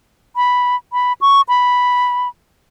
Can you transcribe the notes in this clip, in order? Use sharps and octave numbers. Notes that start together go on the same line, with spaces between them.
B5
B5
C#6
B5